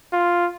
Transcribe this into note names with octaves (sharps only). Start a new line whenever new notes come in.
F4